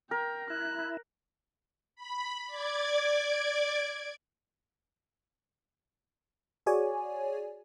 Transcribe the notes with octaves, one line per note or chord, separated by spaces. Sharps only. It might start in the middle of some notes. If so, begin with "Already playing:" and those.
A#4 G5
E4 F#6
B5
D5 D6 G#6
F#4 G#4 C#5 D5 G#5